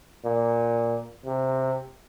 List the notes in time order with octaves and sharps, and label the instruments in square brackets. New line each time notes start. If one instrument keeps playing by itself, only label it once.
[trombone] A#2
C3